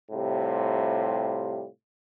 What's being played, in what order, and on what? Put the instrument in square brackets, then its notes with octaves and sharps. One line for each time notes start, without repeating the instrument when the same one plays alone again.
[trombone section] A2 C3 G3 F4